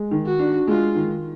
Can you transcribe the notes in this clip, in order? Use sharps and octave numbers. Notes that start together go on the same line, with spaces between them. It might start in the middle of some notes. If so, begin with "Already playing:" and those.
Already playing: G#3
D#3
F#4
D4
G#3 F4
D#3